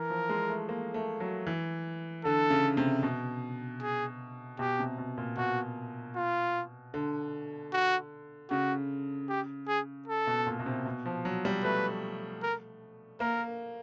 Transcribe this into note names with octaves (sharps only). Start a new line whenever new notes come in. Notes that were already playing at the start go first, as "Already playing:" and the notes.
Already playing: E3 A#4
F3
G#3
A3
A#3
A3
F#3
E3
D3 A4
C#3
C3
B2
G#4
B2 G4
C3
B2
A#2
B2 F#4
F4
D3
F#4
C#3 F#4
G4
G#4
A4
B2
A#2
B2
C3
B2
F3
F#3
G3
A3 B4
A#4
A#3 A#4